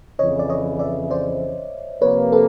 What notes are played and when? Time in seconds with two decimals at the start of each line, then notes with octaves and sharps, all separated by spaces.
0.19 F2 C#3 E3 C#5 D#5
0.39 D5
0.50 C#5 D#5
0.79 D5 E5
1.11 C5 D5
2.02 C3 F3 A#3 B4 C#5
2.32 A4 B4